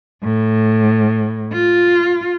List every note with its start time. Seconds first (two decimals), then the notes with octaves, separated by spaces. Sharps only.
0.24 A2
1.53 F4